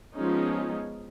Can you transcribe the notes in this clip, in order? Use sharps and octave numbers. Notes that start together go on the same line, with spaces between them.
F3 G#3 B3 C#4 D#4